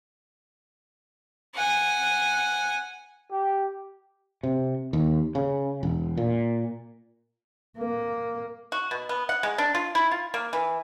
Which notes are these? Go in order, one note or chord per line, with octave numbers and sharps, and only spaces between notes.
F#5 G#5
G4
C3
D#2
C#3
E1
A#2
A#3
F#4
B2
B3
F#5
G#3
D4
F4
E4
F4
A#3
E3